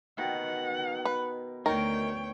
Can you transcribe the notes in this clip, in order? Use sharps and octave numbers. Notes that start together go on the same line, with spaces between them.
B2 D#3 F#5
B4
D2 D#3 A#4 C#5 G5